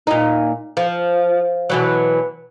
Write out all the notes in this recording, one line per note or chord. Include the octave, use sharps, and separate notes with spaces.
A#2 D#4
F3
B2 E3 F#3